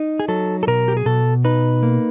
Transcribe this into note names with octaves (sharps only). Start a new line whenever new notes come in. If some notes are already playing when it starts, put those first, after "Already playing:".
Already playing: D#4
G#4
F#3 A4
A4
B2 A#4
G4
G#4
B2 A4
D#4 B4
A#3